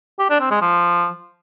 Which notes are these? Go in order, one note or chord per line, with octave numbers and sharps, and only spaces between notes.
G4
D4
C4
G#3
F3